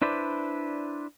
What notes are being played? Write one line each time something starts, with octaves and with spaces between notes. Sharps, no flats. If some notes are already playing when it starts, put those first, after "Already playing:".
D4 E4 B4 C5 D5